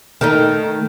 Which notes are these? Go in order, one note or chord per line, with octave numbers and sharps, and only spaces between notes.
D#3 A3 D#4